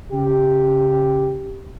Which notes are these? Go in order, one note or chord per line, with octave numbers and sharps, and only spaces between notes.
C#3 G4